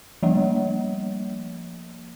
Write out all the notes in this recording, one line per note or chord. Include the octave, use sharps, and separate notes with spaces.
F3 G3 A#3